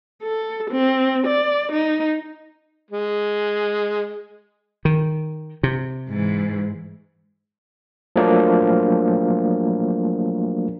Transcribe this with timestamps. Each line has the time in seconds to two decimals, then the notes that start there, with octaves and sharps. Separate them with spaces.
0.23 A4
0.71 C4
1.27 D5
1.72 D#4
2.91 G#3
4.85 D#3
5.63 C3
6.09 G#2 E3
8.16 F3 F#3 A3 A#3 D4